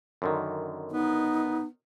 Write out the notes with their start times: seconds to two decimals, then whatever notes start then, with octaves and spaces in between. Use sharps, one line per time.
0.22 F#2 D3 D#3
0.92 B3 D#4